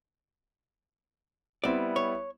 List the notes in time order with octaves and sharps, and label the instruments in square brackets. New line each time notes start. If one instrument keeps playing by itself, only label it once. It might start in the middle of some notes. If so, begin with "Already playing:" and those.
[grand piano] G3 B3 E4 [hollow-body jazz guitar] C4 D5
[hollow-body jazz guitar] C#5